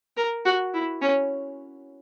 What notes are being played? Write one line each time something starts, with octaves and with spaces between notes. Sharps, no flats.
A#4
F#4
E4
C#4